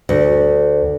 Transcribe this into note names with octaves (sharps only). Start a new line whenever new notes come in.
D2